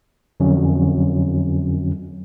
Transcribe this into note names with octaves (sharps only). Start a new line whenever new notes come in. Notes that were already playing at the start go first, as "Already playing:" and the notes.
F2 D3 F#3 C#4